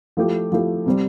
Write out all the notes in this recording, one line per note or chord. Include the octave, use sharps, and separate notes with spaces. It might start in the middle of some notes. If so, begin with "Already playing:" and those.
F3 A3 E4 G4
F3 A3 E4 G4
C3 G3 C4